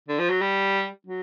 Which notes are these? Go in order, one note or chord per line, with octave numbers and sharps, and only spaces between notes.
D3
F3
F#3
G3
F#3